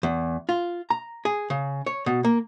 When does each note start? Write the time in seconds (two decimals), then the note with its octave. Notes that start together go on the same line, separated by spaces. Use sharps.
0.03 E2
0.49 F4
0.90 A#5
1.25 G#4
1.50 C#3
1.86 C#5
2.06 B2
2.24 A#3